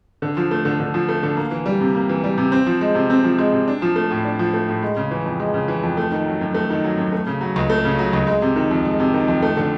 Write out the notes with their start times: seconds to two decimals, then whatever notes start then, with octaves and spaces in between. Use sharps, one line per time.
0.22 D3
0.37 F3
0.51 A3
0.65 D3
0.80 D3
0.94 F3
1.09 A3
1.23 D3
1.37 A#3
1.51 E3
1.66 G3
1.80 C3
1.95 A#3
2.09 E3
2.24 G3
2.38 C3
2.52 C4
2.67 F3
2.81 G#3
2.95 C3
3.10 C4
3.24 F3
3.38 G#3
3.53 C3
3.68 D4
3.82 F3
3.96 A3
4.11 A2
4.25 D4
4.39 F3
4.54 A3
4.68 A2
4.82 G#3
4.97 C#3
5.11 E3
5.26 F2
5.40 G#3
5.54 C#3
5.68 E3
5.83 F2
5.97 A3
6.12 D#3
6.26 F#3
6.41 F#2
6.55 A3
6.70 D#3
6.84 F#3
6.98 F#2
7.12 A3
7.27 C#3
7.41 F#3
7.56 C#2
7.70 A3
7.85 C#3
7.99 F#3
8.13 C#2
8.27 G#3
8.42 C3
8.56 D#3
8.71 F2
8.85 G#3
9.00 C3
9.14 D#3
9.28 F2
9.42 A3
9.57 D3